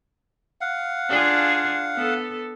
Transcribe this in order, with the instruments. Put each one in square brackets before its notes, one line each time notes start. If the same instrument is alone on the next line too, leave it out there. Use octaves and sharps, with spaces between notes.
[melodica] F5 F#5
[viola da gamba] D4 F4 G#4
B3 A4